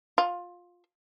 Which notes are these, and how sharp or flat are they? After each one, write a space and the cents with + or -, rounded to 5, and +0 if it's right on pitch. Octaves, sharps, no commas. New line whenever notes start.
F4 +15